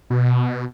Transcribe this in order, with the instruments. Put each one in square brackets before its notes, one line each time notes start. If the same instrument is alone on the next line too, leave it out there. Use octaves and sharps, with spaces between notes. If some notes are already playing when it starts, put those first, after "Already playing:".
[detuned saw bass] B2